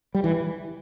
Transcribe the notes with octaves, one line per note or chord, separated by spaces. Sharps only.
G3
E3